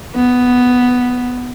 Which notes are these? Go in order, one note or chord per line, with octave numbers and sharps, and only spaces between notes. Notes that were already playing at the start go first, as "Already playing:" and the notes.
B3